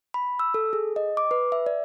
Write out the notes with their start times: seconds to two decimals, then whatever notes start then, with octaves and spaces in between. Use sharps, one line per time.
0.14 B5
0.39 E6
0.54 A4
0.73 G#4
0.96 D#5
1.17 D6
1.31 B4
1.52 E5
1.66 D5